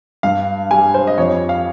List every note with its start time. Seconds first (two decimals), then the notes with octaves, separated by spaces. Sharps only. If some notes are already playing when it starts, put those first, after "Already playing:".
0.23 G2 F5
0.71 G3 G#5
0.94 C5
1.07 D#5
1.18 F2 C#5
1.49 F5